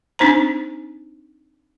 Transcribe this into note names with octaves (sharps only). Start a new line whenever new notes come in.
C4 D4 D#4 C5 A#5